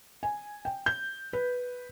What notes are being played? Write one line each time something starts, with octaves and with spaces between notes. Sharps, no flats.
G#5
G5
G6
B4